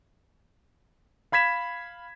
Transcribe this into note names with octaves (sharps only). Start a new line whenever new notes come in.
F5 B5 G#6 B6 E7